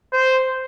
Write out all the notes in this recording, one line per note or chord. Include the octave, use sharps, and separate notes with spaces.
C5